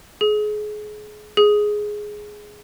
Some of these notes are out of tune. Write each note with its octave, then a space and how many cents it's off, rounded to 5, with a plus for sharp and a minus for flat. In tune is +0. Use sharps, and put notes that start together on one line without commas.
G#4 +30
G#4 +5